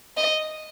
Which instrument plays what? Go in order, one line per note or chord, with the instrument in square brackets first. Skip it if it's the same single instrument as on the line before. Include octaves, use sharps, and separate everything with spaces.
[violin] D#5